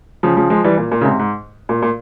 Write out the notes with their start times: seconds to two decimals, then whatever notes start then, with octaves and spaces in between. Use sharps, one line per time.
0.23 C#3 F3
0.37 C#3 F3
0.50 F3 G#3
0.64 E3 G3
0.77 A#2
0.92 A#2
1.01 C#3
1.05 G#2 C3
1.19 G#2
1.69 A#2
1.82 A#2